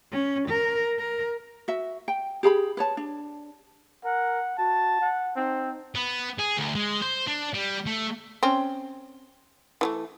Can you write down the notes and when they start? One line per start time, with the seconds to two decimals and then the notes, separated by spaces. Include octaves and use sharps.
0.12 C#4
0.48 A#4
0.98 A#4
1.68 F#4 E5
2.08 G5
2.43 G4 G#4 A#5 B5
2.77 B4 C#5 A5
2.97 D4
4.05 A#4 F#5
4.58 F#4 A5
5.01 F#5
5.37 C4 D#4
5.95 B3
6.38 G#4
6.57 D2
6.75 G#3
7.02 C5
7.27 D4
7.54 G3
7.86 A3
8.43 C4 C#4
9.81 E3 F3 A3